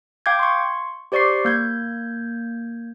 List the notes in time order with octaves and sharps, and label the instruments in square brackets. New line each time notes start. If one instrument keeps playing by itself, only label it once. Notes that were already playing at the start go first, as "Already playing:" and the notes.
[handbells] F5 G5 D6 G6 G#6
C6 C#6
G4 C5 D5 C#6 D6 C7
A#3 G6 G#6